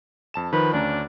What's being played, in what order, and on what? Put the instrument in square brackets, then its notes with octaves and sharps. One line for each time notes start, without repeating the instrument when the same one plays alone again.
[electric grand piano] F2 A5 E7
[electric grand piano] D#3 F3 [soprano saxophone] B4
[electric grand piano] D2 C#4 A#5 [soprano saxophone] D4